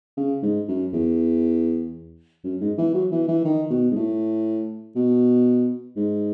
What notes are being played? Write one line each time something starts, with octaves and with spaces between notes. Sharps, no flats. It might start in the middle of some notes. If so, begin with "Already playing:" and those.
C#3
G#2
F#2
E2
F#2
G#2
E3
F#3
E3
E3
D#3
B2
G#2
A2
B2
G#2